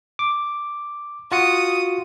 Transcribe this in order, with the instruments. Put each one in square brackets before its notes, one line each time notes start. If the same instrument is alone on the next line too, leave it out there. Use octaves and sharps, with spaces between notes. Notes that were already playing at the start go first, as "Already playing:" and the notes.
[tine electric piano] D6
[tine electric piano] F4 F#4 C#7 [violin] D#6